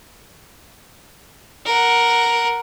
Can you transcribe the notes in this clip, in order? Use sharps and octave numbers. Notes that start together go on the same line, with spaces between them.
A#4 F#5